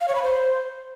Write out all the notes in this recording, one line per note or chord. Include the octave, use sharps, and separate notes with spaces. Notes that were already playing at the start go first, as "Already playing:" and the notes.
F5
C#5
B5
C5